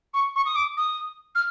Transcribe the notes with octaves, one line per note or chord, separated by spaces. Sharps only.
C#6
C#6
D#6
D6
D#6
F6